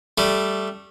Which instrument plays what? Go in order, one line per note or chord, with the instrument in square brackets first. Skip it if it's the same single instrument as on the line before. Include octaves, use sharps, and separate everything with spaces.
[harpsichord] G3 A3